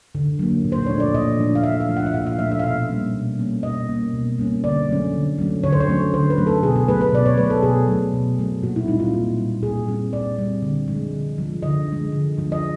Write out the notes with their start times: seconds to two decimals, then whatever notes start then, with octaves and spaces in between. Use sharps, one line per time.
0.15 D3
0.39 F#3 A#3
0.64 A#2
0.72 C5
0.86 F3 A3 D4 C#5
1.00 D5
1.14 A#2 D#5
1.39 F3 A3 D4
1.55 F5
1.63 A#2 E5
1.80 F5
1.89 F3 A3 D4
1.97 F#5
2.06 E5
2.14 A#2 F5
2.26 F5
2.39 F3 A3 D4 E5
2.52 E5
2.59 F5
2.63 B2 E5
2.89 G3 A#3 C#4
3.14 B2
3.38 G3 A#3 C#4
3.63 B2 D#5
3.89 G3 A#3 C#4
4.14 B2
4.38 G3 A#3 C#4
4.64 D3 D5
4.89 F#3 A3 C#4
5.13 D3
5.38 F#3 A3 C#4
5.63 D3 C#5
5.72 C5
5.80 C#5
5.89 F#3 A3 C#4
6.13 D3 C5
6.30 B4
6.38 F#3 A3 C#4
6.47 A4
6.63 B2 G#4
6.76 G#4
6.88 F#3 A3 B4
7.01 B4
7.13 B2 D5
7.26 C#5
7.38 F#3 A3 B4
7.50 A4
7.63 B2 G#4
7.88 F#3 A3
8.14 B2
8.39 F#3 A3
8.63 A#2 F#4
8.76 E4
8.88 G3 C4 D#4
9.00 F4
9.13 A#2
9.38 G3 C4
9.63 A#2 G#4
9.87 G3 C4
10.13 A#2 D5
10.38 G3 C4
10.62 D3
10.88 F3 G#3
11.13 D3
11.38 F3 G#3
11.62 D3 D#5
11.88 F3 G#3
12.12 D3
12.37 F3 G#3
12.52 D#5